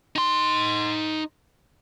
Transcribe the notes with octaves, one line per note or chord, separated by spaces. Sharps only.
D#4 C6